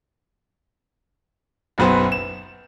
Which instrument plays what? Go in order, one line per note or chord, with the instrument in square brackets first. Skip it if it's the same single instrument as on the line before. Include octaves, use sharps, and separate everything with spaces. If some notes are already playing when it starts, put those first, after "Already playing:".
[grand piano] F#1 B1 F#3 B3 B4 C5
E7